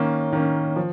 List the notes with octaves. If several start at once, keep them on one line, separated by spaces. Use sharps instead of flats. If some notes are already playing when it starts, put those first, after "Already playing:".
Already playing: D#3 A#3 C#4
D#3 A#3 C#4
F3